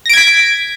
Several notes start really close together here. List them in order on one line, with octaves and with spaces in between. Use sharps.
A#6 D7 G#6 B6